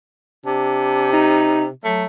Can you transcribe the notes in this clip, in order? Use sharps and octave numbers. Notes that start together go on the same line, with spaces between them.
C3 D4
D#4
F#3 A3